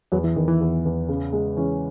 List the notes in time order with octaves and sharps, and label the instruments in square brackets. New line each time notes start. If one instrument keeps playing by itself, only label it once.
[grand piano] E2 [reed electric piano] F#3
[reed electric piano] E3
[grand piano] E2 [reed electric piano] D#3
[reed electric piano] E3
[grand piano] E2
E2
C#3
G#3
[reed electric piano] E3 [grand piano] C#4